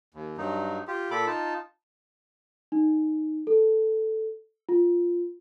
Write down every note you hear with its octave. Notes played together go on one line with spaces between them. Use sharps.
D#2
G2 F#3 D#4
F4 G4
A#2 A4 B5 D6
D#4 F4 A5
D#4
A4
F4